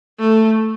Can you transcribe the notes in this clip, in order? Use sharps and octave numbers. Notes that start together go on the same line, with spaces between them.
A3